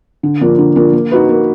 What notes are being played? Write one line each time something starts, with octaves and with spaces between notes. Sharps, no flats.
D3
F3 A#3 D4
D3
F3 A#3 D4
A#3
D#4 F#4 B4
A#3